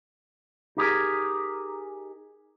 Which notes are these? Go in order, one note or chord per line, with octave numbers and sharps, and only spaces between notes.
D#4 G4 G#4 A#4